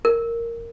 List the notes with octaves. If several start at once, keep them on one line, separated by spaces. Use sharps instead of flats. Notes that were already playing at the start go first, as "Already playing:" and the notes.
A#4